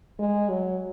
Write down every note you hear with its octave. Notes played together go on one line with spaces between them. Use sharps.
G#3
F#3